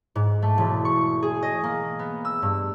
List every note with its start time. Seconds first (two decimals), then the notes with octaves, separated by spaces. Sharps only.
0.15 G#2
0.42 A3
0.58 E1
0.85 C#6
1.23 G#4
1.43 D#5
1.64 A#3
1.99 B3
2.25 E6
2.42 G2